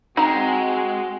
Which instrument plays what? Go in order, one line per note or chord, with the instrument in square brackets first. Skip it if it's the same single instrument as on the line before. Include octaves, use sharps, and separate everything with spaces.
[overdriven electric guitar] G#3 [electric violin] C4 [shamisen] D#4 A#5 [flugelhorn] F#4